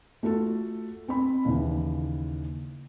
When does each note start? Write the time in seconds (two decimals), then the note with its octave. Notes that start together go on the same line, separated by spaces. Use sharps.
0.23 A3 F4 F#4 A4
1.08 C4 B5
1.45 D#2 C#3 E3